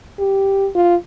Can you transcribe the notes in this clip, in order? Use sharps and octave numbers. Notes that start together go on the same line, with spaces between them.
G4
F4